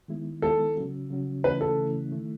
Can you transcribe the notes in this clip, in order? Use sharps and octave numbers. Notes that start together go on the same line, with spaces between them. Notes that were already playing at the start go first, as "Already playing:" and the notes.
D#3 G#3 B3 E4
D#3 G#3 B3 E4 A4
C#3 F#3 C#4 F#4
C#3 F#3 C#4 F#4
C#3 E3 A3 C#4 E4 B4
A4
C#3 E3 A3 C#4 E4
D#3 A3 E4